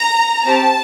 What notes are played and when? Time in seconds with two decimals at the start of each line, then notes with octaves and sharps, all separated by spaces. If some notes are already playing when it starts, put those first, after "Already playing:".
Already playing: A#5
0.44 C4 G4 A5